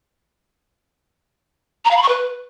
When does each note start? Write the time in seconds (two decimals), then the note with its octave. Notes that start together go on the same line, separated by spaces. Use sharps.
1.85 A#5
1.91 F5
1.97 B5
2.02 C#6
2.08 B4